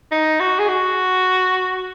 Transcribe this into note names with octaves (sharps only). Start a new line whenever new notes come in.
D#4
F#4
G#4
F#4